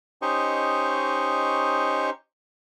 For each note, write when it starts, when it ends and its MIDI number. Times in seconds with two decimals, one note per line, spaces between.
0.22 2.10 61
0.22 2.10 63
0.22 2.10 67
0.22 2.10 72
0.22 2.10 75
0.22 2.10 85